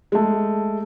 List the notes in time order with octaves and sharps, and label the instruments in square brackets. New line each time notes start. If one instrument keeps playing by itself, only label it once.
[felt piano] G#3 A3